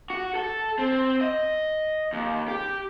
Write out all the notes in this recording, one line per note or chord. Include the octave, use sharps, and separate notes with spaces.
F#4
A4
C4
D#5
D#2
G4